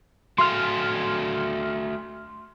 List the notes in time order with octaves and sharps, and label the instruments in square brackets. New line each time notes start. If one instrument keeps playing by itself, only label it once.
[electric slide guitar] A3 F#4 F5 [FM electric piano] C6 F6